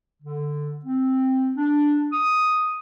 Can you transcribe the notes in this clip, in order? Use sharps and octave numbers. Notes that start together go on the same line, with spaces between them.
D3
C4
D4
D#6